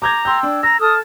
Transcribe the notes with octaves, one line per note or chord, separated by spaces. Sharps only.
A#5 D6 G6 G#6
G5 C6 E6 G6
D4
A#5 E6 A#6
A4 A5 D#6 F6